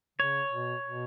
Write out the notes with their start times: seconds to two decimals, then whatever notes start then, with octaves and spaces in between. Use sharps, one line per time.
0.18 C#3 C#5
0.52 B2
0.85 B2